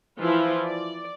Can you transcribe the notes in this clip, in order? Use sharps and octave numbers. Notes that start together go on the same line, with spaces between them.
E3 F3 E4 F4
D5